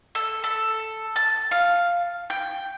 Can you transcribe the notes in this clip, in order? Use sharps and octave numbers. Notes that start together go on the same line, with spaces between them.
A4
A4
A5
F5
G5